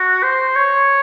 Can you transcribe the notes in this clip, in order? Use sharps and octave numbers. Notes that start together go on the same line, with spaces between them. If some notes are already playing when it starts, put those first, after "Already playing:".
Already playing: F#4
C5
C#5